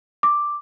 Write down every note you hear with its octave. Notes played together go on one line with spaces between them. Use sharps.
D6